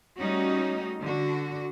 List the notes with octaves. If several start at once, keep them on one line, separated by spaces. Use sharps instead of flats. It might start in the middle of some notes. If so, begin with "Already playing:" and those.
G3 A3 C#4 D#4 F#4
D3 D4 F#4